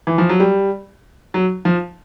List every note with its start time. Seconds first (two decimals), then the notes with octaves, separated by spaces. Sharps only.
0.07 E3
0.18 F3
0.29 F#3
0.40 G3
1.34 F#3
1.65 F3